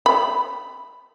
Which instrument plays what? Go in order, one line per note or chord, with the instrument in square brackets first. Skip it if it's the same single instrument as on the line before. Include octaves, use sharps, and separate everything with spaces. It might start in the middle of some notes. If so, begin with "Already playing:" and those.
[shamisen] B5